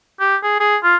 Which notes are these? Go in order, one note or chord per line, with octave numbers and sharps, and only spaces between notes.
G4
G#4
G#4
F4